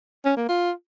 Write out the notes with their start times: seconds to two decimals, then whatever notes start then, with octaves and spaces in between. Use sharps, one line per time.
0.25 C#4
0.37 A#3
0.49 F4